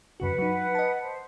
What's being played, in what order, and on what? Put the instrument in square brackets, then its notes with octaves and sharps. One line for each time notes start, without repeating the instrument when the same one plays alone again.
[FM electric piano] F#2 C#3 F#4 [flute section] B4 F#5
[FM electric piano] F#3 D#4
D#5 A5
[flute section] C5